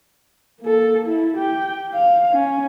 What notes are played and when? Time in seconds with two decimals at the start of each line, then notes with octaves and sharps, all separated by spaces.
0.61 A#3 A4
1.07 E4
1.37 G4 G5
1.94 F5
2.32 C#4